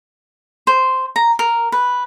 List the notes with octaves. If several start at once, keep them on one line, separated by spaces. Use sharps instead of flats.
C5
A#5
A#4
B4